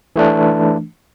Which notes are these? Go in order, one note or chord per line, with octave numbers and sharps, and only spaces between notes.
E3 A3 D4